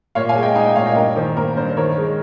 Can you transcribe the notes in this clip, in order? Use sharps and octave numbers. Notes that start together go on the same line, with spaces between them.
A#2 C#5 F5
F5 G#5
G#3
D#5 G5
D#4 F5 G#5
D#5 G5
A#2 C#5 F5
D#5 G5
G2 A#4
D#3 C5
A#3 A#4
G2 C5
D#3 A#4 C#5
G#3